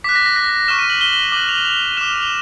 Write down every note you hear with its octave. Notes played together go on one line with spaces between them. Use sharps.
D6 F#6 B6
A#6
A#6
A#6
C#6 F6 E7
D#7
F#7
G7
D6 F#6 F#7
F7
F7
D6 F6 E7
F7